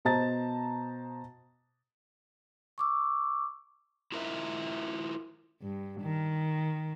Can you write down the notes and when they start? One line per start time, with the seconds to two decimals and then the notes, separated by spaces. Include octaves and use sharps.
0.05 B2 C5 D#5 A5 A#5 A6
2.78 C#6 D6 E6
4.12 E4 F4 A#4 C5 D#5 E5
5.62 G2
6.01 D#3